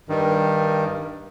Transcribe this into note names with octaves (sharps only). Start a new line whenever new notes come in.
G2 D#3